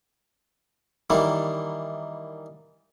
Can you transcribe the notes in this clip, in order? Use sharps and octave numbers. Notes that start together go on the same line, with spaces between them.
D#3 E3 G3 A#3